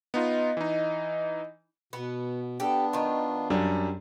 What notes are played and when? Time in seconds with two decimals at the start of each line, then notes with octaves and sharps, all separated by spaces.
0.14 B3 D#4 F4 D#5
0.57 E3 D#4
1.93 B2 B3
2.60 B3 D4 G4 A4
2.93 D#3 F4
3.50 F#2 G3 D4